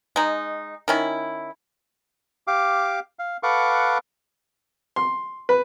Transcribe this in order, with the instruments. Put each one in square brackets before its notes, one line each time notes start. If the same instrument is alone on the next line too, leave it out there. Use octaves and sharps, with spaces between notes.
[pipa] G#3 D#4
D#3 C#4 E4
[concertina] G4 F5 D6
F5
A4 B4 F5 F#5 C#6 D6
[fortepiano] C6
B4